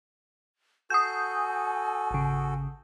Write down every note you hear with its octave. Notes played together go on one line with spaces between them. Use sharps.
F#4 A4 G#5 D#6 G6
G#1 C#3